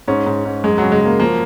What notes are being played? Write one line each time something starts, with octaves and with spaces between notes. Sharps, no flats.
G#2 C#4
G#2
G#2
F#2 G#3
C#3 F#3
G#3
F#3 A#3
F3 A#3